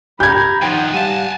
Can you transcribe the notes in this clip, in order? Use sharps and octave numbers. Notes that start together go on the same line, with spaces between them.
G4 A#5 B5 G6 G#6
D#3 F3 D#4 C5 F#5 G5
G3 F5 G#5 A5